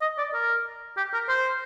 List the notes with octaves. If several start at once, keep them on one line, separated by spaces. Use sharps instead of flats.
D#5
D5
A#4
G4
A#4
C5